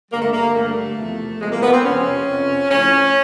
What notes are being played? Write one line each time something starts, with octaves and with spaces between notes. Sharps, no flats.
G2 D3 G3 A#3
A3
A#3
G2 D3 G3 A3
E2 C3 F3
E2 C3 F3 G#3
A#3
B3
C4
F2 C3 F3 C#4
F2 C3 F3
A2 F3 C#4